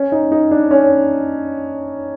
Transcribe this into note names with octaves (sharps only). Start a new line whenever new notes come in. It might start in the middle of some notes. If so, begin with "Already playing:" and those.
Already playing: C#4
D#4
D#4
D4
C#4